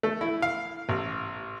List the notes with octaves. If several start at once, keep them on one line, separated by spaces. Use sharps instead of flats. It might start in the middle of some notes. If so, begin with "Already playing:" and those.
A3
E4
F5
A1